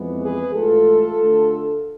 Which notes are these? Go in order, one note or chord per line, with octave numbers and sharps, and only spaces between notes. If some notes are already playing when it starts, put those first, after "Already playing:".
Already playing: F2 E3 G#3 B3
G#4 B4
G#2 E3 A3 F4 A4
D2 D3 A3